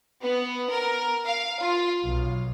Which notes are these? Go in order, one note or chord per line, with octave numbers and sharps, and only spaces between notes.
B3
A#4
F5
F4
B1